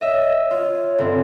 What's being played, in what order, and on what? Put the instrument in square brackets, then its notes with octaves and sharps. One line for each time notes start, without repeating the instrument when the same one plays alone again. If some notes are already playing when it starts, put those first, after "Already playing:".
[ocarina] C#5 [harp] D#5 E5
[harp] F4 [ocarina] C#5
[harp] G1 C4